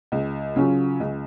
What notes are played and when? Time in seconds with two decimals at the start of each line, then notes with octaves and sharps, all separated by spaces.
0.12 C#2
0.56 C#3 F#3 C#4 F4
1.00 C#2